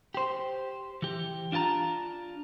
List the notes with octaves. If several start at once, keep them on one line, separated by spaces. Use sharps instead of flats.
G4 C5
E3 G4
D4 F4 F#4 A5 A#5